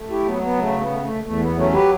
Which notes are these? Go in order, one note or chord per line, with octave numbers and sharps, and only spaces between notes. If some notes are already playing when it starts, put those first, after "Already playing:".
Already playing: A3
E4 G4
F#3 B3
A3
B3
C#3 A3
B3
A3
A3
E2 A3
B3
F#3 A3 C#4
G4 B4